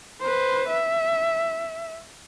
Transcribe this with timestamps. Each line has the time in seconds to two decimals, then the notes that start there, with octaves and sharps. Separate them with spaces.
0.21 B4 C5
0.68 E5